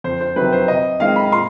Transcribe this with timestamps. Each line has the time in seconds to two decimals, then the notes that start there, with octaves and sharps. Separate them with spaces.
0.04 F2 C5
0.21 C5
0.36 C3 D#3 F#3 B4
0.52 C5
0.68 C3 D#5
1.00 D#3 G#3 C4 F5
1.16 B5
1.32 A#2 C6